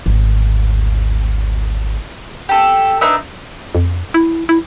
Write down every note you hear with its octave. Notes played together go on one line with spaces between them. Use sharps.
G#1 D2
G4 A4
D4 D#4 B4 E5
F2
E4
E4